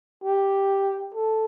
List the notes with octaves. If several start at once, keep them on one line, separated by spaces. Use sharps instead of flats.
G4
A4